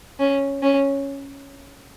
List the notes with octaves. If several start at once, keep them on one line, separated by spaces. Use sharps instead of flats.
C#4
C#4